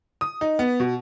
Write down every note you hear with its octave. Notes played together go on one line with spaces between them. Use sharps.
D#6
D#4
B3
B2